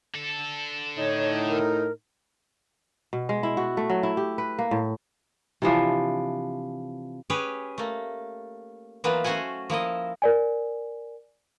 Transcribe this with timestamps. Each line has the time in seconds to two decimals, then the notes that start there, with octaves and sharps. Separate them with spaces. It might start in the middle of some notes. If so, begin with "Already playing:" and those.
0.15 D3 A4
0.98 A2 D#4 C#5
1.49 A#4
3.13 B2
3.29 G#3
3.43 E4
3.57 F#4
3.77 A3
3.90 F#3
4.03 E4
4.17 G4
4.38 B4
4.59 A#3
4.71 A2
5.62 C3 E3 F3 D4
7.30 C#4 G4 G#4 B4 C#5
7.78 A3 A#3
9.04 E3 F#3 A#3 B3 F4 B4
9.24 A3 C#4 F#4 C5 F#5 G#5
9.70 F3 A#3 E4 D#5
10.22 A#4 D5 G#5